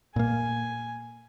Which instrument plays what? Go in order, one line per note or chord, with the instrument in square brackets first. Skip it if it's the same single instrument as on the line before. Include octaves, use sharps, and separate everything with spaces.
[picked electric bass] A#2 A#3 [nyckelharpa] G#5